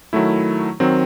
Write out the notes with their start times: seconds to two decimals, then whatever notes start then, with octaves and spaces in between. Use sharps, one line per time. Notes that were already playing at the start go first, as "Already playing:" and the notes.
0.13 D#3 F#3 A3 E4
0.80 D#3 F#3 C4